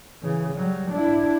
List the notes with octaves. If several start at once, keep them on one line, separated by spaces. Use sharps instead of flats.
C#3 E3
F#3 G3
D4 E4